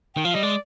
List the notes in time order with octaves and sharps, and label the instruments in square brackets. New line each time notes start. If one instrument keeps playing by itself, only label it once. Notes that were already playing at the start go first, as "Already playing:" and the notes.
[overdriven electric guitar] D#3 [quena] G5
[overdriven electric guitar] F3 [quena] F5
[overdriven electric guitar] G3 [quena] D#5
[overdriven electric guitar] G#3 [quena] D5